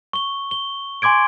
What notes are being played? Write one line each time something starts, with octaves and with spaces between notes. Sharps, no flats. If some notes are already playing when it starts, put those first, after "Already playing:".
C#6 G7
G7
G#5 C6 D6 G#6 D7